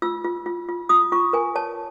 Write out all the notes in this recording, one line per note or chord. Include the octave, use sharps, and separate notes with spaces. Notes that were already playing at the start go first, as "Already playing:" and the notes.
F4 E6
F4
F4
F4
F4 D#6
F4 C#6
A#4 G#5
C#5 A5